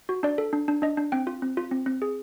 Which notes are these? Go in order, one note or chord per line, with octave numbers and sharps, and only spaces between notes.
F#4
D4 D5
A4
D4
D4
D4 D#5
D4
C4 G5
F4
C4
F4
C4
C4
G#4